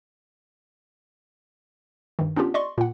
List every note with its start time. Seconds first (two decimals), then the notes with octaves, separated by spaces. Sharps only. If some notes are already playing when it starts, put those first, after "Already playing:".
2.19 G2 D#3
2.36 B3 C#4 D4 F4 G4
2.54 D5 D#5 C6 C#6
2.78 A#2 F#5